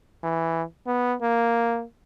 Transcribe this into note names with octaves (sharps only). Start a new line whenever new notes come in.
E3
B3
A#3